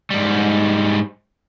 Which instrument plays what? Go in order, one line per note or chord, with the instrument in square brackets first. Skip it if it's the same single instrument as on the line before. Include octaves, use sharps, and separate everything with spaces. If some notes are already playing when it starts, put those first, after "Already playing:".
[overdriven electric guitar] G#2 G3